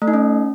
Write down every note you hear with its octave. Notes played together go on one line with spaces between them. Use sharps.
A3
D#4
C#4